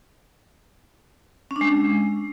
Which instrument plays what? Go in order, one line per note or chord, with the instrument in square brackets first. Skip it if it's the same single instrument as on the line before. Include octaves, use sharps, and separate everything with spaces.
[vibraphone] C#4
D4
G#3